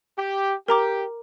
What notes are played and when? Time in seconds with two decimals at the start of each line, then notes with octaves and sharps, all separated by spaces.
0.18 G4
0.68 G4 A#4 A#5 D6